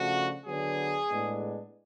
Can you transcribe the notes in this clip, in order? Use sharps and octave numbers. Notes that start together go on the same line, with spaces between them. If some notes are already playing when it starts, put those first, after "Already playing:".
Already playing: C#3 F3 A3 D4 F#4
D3 F#3 B3 D4 G#4
A2 G#3 B3 D4